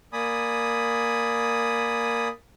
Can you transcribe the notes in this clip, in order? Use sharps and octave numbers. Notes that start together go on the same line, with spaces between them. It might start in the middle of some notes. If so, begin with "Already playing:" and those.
A#3 D5 G#5 B5 D#6